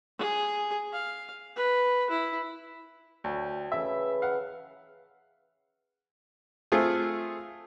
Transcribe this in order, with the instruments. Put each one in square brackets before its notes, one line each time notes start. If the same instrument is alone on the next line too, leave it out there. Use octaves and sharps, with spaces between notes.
[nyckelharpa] G#4
F5
B4
E4
[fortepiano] D2 [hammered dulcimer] G5 A5
[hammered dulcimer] C#3 E3 [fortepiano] E5
[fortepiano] F5 F#5
A3 C4 F4 G#4